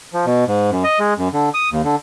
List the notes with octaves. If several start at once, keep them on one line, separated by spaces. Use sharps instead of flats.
F3
B2
G#2
F#2
D#5
G#3
F#2
D3
D#6
D#2
D3